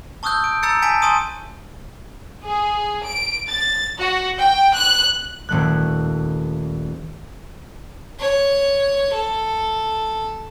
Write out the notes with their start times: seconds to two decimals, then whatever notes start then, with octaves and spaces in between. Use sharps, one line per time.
0.23 A5 C#6 D#6 E6 F#6 G6
0.44 D7
0.63 A#5 E6 G6 A6 C#7
0.82 G#5 A5 B6 D7
1.02 G#5 A5 C6 C#6 D#6 D#7
2.44 G#4
3.04 D7
3.49 A6
3.97 F#4
4.38 G5
4.75 F#6
5.49 D#1 A3 F#6
8.19 C#5
9.14 A4